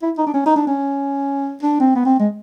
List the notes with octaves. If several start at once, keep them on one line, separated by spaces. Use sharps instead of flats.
E4
D#4
D4
C#4
D#4
D4
C#4
D4
C4
B3
C4
G#3